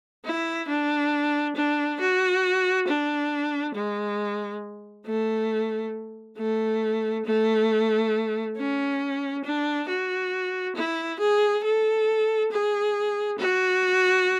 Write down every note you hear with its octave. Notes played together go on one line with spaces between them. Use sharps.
E4
D4
D4
F#4
D4
G#3
A3
A3
A3
C#4
D4
F#4
E4
G#4
A4
G#4
F#4